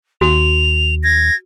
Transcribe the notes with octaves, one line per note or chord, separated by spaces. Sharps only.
D#2 F#4 F7
G#6 A#6